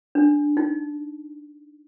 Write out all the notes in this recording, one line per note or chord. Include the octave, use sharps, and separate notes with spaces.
D4
D#4